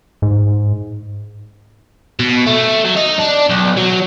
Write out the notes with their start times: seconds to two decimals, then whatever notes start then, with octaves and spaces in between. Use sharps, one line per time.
0.22 G#2
2.20 B2
2.47 A3
2.85 F#3
2.96 D#4
3.19 D4
3.49 B1
3.77 F#3